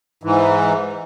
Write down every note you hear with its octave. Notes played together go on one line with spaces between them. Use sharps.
G#2 E3